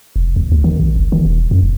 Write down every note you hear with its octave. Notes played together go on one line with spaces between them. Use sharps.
F1
D#2
D2
D#3
B1
F#1
D#3
E1
F#2
F1